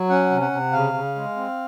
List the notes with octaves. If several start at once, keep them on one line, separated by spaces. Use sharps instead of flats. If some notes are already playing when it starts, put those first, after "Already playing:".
Already playing: F#3
C#4 F#5
C3
F#5
C3
C#3 F5
C#3
G#3
C4